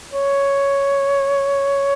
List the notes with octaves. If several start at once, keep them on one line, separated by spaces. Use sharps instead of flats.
C#5